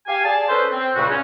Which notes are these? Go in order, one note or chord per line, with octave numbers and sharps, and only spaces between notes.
G4 F5 G#5
G#4 D5 G#5 A5
C#4 A4 B4 C5
C4
C#2 A#2 C#3 G3 F#4
C#4